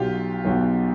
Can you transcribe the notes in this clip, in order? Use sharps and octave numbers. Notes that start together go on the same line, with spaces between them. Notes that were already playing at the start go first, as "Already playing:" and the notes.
Already playing: B1 B2 F4 G4
B1 B2